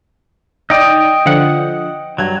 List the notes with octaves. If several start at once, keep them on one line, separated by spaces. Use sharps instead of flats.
D#4 D5 D#5 G5 D#6
D3 F3 F#5
G2 F#3 G#6